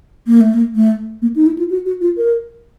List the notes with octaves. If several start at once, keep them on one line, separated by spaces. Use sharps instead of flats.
A#3
A3
A#3
A3
A#3
D#4
E4
F4
F#4
F#4
F4
A#4